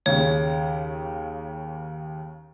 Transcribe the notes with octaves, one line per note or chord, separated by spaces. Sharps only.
D#2 C#3 C#5